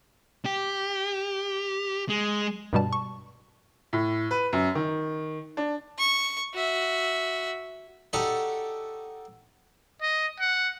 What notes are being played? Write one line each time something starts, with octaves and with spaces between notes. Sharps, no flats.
G4
G#3
G2 B2 G3 A5
C#6
A2
B4
F#2
D#3
D4
C#6
F#4 E5
D#4 F#4 G4 A4 D5 D#5
D#5
F#5